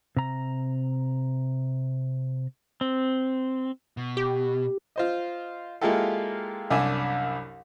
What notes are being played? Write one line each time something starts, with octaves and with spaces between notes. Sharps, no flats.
C3 A#5
C4
B2
G4
F4 C5 D#5
G#3 A#3 E4 F4 G4 A4
C2 F#2 D4 E5 G#5